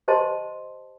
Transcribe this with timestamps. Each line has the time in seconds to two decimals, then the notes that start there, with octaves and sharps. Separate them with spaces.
0.08 G4 C5 D#5 A5 C6